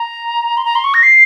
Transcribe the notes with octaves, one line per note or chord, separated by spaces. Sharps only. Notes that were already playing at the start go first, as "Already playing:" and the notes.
Already playing: A#5
C6
A#5
C6
C#6
A#6
C7